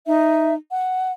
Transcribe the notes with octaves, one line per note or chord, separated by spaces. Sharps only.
D#4 E5
F#5